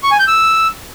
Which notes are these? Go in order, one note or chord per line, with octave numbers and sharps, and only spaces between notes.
C#6
G#5
G6
E6